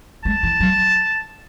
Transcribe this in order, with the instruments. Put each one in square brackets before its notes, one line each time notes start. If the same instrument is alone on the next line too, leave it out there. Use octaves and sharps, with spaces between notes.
[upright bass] G#3 [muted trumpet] A5
[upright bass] E3
F#3